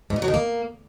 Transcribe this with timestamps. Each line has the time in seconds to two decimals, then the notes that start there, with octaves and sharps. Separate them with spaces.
0.10 G#2
0.16 A#2
0.22 F#3
0.28 D#3
0.34 A#3